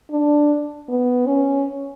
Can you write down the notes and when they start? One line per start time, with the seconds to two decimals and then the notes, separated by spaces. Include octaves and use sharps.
0.11 D4
0.89 B3
1.26 C#4